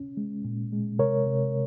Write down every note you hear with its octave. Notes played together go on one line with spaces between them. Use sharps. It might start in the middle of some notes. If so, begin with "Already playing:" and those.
Already playing: C#4
G#3
A#2
G#3
C3 A#4 C#5
C3